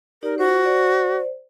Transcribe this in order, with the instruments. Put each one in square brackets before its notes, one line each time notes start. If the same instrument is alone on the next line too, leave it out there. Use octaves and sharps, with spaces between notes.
[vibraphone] D#4 G4 D5 [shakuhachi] A#4
[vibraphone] F4 C5 [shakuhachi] F#4
[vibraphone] C5 D5